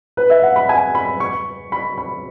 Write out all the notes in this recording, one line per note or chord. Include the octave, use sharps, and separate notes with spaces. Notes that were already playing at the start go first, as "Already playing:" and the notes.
B4
E5
F#5
B5
G#5
B5
C#6
B5
B5